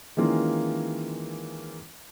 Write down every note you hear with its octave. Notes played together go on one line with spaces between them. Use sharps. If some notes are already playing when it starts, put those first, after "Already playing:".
D#3 E3 G#3 A#3 C#4 F4